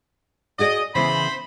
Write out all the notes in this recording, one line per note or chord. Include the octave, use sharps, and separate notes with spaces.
F#4 G#4 D5 D#5
C#3 E3 B3 C5 B5